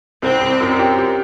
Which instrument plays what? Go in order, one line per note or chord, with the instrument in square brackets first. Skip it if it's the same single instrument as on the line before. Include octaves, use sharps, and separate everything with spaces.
[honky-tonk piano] C2 [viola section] C4
[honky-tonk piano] C2
F#2
G4
G4